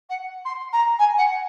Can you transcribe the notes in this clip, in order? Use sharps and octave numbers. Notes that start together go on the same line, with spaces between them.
F#5
C6
A#5
G#5
F#5